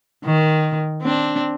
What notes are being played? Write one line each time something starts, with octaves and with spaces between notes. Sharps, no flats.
D#3
C4 D4